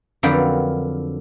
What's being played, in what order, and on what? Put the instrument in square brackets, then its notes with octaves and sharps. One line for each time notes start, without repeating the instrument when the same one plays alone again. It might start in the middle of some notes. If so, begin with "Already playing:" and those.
[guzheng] F2 D3 F#3 A#4 B4 G5